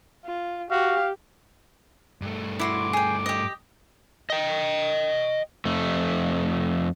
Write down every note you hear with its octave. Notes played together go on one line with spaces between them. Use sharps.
F4
F#4 G4 F5
G2 A3
E4 F#4 C6 D6
G#4 G5
G4 D#5
D#5 G5
F2 A3